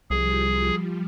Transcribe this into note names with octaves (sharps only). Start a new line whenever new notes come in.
C2 F3 G3 G#4